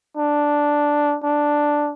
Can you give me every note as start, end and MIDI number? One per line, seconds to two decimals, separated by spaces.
0.17 1.17 62
1.24 1.93 62